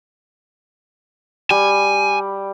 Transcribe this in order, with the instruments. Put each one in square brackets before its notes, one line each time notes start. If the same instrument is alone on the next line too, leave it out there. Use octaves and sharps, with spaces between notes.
[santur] G3 [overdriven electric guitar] G#5